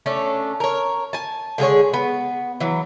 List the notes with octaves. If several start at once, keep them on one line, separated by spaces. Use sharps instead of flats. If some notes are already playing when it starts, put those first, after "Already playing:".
A3 C#4 D4
A#4 C#5
G#5 A5
D3 G#3 G#4 C#5
B3
E3 F#3